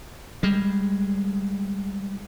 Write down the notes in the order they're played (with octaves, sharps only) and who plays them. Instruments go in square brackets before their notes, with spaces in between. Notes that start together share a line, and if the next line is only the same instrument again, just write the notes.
[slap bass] G3 G#3